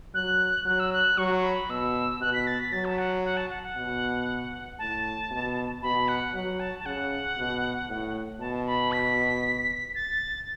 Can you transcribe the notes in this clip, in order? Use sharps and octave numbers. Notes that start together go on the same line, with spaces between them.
F#3 F#6
F#3 F#6
E6
F#6
F#3 C#6
C#6
B5
B2 E6
B2 F#6
B6
A6
B6
F#3 A6
A5
F#5
F#5
A5
F#5
F#5
B2
A2 A5
B2
B2 B5
F#5
F#3 F#5
A5
A5
C#3 F#5
B2
A2
B2 A5
B5
B6
A6